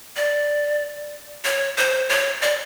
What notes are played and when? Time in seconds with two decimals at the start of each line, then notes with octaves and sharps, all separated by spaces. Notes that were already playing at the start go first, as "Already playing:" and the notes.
0.16 D5
1.45 C#5
1.78 C5
2.09 C#5
2.42 D5